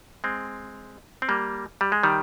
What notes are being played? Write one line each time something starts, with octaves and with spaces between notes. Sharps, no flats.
G#3 C4
C4
G3 A#3
G3
G#3
D#3 G3